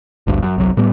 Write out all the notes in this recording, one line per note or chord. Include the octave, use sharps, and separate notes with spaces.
G#1 D2 G2
F#2
G1 C2 F#3
A2 G3 B3